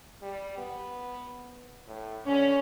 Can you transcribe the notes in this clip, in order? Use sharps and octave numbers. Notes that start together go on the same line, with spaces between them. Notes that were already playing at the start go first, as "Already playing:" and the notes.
G3
B3
A2
D3 C#4